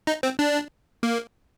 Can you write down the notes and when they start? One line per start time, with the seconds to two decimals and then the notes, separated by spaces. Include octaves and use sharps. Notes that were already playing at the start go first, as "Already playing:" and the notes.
0.07 D#4
0.23 C4
0.39 D4
1.03 A#3